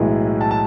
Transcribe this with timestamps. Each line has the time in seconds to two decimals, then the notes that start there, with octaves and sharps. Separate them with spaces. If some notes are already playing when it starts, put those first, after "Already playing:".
Already playing: B1 A2 E3 G#3
0.41 A5
0.51 A5